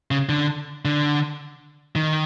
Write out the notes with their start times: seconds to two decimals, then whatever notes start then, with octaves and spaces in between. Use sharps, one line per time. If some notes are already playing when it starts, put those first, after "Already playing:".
0.11 C#3
0.29 D3
0.85 D3
1.95 D#3